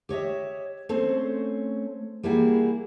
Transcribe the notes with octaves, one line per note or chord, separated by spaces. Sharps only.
G4 C#5 D#5 E5
A3 C4 C#4 C5
G3 A#3 E4 F#4 G#4